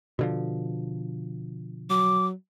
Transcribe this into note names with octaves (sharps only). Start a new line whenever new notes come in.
B2 D3 F3
F#3 D6